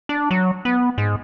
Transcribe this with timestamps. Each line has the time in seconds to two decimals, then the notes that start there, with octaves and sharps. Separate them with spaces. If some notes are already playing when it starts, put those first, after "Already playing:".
0.09 D4
0.31 F#3
0.65 B3
0.98 G#2